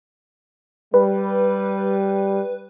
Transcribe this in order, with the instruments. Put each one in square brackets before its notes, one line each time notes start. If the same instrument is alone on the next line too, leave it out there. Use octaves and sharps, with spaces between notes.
[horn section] G3 [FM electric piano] B4